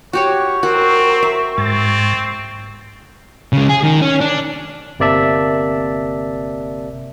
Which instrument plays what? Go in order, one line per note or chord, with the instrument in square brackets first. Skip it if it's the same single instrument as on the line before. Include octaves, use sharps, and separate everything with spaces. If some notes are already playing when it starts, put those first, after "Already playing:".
[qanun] F#4 G4 C#5 [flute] C#6
[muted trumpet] C4 [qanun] F#4 [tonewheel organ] A#4
[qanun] E5
[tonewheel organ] G#2 A6 [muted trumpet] C4
[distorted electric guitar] C#3 G#3
G#4
D#3
C#4
D4
[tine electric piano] G1 C3 A#3 D5 E5 A5